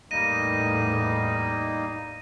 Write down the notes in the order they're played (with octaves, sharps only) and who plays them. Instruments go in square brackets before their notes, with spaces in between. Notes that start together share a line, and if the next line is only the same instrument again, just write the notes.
[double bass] E2 A2 [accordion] G3 A#3 D#4 [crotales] A#6 D#7